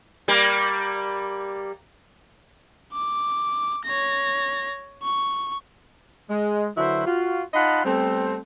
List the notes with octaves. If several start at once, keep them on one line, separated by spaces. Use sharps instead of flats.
G3 A#3
D6
C#5 A#6
C#6
G#3
D3 F#3 E4 F#4 B4 C5
F4 F#4
D#4 F4 D#5 F#5 A5 B5
G3 A3 B3 C4